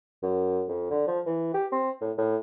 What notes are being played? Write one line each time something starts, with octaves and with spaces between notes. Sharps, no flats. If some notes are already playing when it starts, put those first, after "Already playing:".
F#2
F2
D3
F3
E3
G4
C4
A2
A2